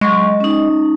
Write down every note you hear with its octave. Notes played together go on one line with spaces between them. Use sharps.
F#3 G#3 C#6
C#4 D#4